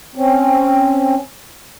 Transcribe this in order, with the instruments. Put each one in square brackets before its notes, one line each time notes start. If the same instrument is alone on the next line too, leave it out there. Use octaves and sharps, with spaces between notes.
[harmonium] C4 C#4